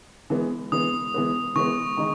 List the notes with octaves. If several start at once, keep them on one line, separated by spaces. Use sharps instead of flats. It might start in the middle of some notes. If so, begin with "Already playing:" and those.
E3 G#3 B3
E3 G#3 B3 D#6
E3 G#3 B3
E3 G#3 B3 C#6
D#3 G#3 D#4